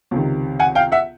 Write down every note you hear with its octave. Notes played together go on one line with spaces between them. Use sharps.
C#2 C3 D#3
F#5 G#5
F5 G5
E5 F#5